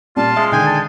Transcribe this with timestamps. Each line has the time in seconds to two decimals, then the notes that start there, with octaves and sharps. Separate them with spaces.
0.17 A#2 G3 F4 A5
0.36 G#3 E5
0.52 D3 D#3 G5 G#5
0.66 A5